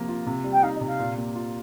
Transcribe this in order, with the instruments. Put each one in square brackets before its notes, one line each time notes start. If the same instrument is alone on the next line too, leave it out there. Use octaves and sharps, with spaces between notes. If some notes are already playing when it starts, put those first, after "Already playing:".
Already playing: [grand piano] C3 F3 A#3
F4
C3
G3
[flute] G5
[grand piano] D#4 [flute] F5
[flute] D#5
[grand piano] C3
[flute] F5
[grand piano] A#2
A#3
F4